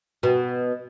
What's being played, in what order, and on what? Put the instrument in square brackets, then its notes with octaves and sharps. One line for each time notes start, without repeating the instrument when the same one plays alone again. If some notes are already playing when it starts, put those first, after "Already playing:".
[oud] B2